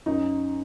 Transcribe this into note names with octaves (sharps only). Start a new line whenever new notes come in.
F#2 D#4